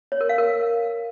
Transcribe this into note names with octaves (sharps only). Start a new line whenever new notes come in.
C#5
A#4
F5
A#4